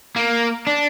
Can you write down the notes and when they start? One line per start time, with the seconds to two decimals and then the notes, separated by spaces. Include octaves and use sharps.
0.16 A#3
0.67 D4